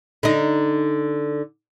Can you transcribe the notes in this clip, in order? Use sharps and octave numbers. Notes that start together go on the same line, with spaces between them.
D3 D#4